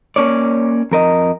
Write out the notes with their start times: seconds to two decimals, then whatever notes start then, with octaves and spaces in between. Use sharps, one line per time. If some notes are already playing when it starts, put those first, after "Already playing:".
0.16 A#3 C#4 C#5 D5
0.92 F2 A#4 D#5